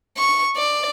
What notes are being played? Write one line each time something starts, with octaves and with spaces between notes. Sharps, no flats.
C#6
D5